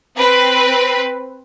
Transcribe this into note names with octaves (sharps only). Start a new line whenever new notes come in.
C4 B4